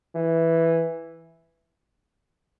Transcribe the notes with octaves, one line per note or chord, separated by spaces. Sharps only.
E3